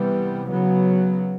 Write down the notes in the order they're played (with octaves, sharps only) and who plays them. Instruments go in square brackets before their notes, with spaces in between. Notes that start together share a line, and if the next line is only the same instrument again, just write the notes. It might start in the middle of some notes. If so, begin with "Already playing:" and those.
Already playing: [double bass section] C3 E3 G3 B3
C#3 F#3 B3